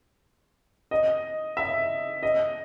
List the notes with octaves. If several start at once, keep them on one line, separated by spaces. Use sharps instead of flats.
D#5
E5
D#5